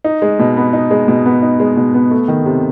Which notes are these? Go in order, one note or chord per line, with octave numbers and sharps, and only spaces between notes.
D#4
G#3
B2
B3
D#4
G#3
B2
B3
D#4
G#3
B2
B3
A3
D#3
C3